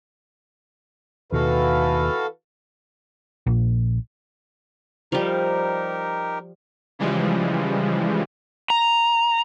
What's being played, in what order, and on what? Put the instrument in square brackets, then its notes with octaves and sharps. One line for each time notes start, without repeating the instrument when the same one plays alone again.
[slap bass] D#2 B2 [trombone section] E3 B4 [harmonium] F#4 A4 F5
[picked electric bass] A#1
[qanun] F3 G3 [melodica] D#4 G4 A#4
[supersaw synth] C#3 E3 F3 G3 G#3
[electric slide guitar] A#5